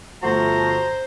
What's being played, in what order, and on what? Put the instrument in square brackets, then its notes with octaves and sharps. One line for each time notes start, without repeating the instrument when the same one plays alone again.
[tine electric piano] G1 F#4 [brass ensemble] F3 A3 [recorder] C5 [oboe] A#5